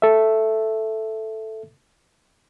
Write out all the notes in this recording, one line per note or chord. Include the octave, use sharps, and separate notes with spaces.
A4 E5